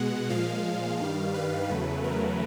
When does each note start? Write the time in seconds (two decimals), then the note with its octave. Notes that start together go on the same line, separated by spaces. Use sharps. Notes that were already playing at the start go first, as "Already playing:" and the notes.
Already playing: B2 G#3 F#5
0.29 A#2 F3 G#3 F5
0.99 G2 D#3 G3
1.34 B4
1.69 E2 C#3 F#3 A3
2.04 A#4